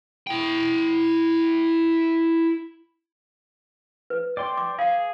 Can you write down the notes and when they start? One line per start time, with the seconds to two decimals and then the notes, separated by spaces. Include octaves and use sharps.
0.27 E4 G5
4.10 B4
4.37 D5 G5 C6
4.57 D6
4.79 G#4 F5